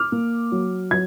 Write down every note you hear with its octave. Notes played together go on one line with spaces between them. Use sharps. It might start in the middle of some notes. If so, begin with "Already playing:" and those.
Already playing: D6 F6
A#3
F#3
F#3 G#6